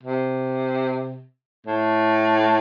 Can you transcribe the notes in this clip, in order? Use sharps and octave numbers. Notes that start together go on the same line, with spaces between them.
C3
A2